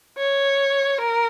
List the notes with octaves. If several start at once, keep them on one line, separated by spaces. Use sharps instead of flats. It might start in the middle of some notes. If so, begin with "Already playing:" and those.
C#5
A#4